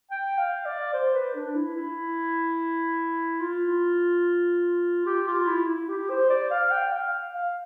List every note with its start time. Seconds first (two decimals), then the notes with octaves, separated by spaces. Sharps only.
0.11 G5
0.38 F5
0.65 D5
0.93 C5
1.14 B4
1.35 D4
1.55 E4
1.76 E4
3.41 F4
5.06 G4
5.27 F4
5.47 E4
5.68 E4
5.89 G4
6.10 C5
6.30 D5
6.51 F5
6.71 G5
6.92 F5
7.34 F5